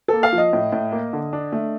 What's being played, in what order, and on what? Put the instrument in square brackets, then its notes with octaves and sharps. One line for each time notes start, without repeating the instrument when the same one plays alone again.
[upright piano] A#3 [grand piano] A4
[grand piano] F5
[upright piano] F3
[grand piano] D#5
[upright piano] A2
A2
A#3
D3
D4
A3